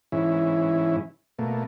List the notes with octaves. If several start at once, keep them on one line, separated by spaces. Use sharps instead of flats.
G#2 E3 C#4 E4
B2 A3 A#3